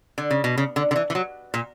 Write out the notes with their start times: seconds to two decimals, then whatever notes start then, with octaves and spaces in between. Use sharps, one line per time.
0.18 D3
0.31 C#3
0.44 B2
0.58 C#3
0.76 D3
0.91 D3
0.96 E3
1.10 E3
1.15 F#3
1.54 A#2